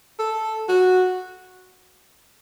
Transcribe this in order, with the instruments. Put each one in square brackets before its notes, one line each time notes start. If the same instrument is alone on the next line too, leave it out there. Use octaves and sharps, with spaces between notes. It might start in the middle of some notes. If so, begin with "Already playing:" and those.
[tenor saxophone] A4
F#4